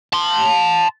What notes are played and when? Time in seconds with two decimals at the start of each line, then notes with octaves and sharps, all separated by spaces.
0.13 A5 C6